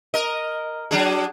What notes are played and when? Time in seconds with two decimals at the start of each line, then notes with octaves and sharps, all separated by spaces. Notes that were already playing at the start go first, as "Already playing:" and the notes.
0.14 A#4 D#5
0.91 F#3 D4 G#4